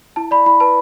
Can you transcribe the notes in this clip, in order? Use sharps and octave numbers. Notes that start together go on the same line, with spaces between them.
E4 A5
D5 B5
E4 B5
B4 A5